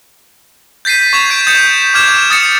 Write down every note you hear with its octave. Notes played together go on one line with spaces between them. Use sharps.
G6 A6 B6 C7 D#7
C#6 G#6 E7 F7
C#6 G6 D7
D#6 G6 A6 C#7 E7
D6 F6 G#6 E7
D#6 A6 C#7